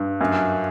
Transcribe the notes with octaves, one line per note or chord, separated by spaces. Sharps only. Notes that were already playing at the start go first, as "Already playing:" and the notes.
Already playing: G2
F#2